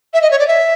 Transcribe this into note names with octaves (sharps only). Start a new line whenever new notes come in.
E5
D#5
C#5
D5
E5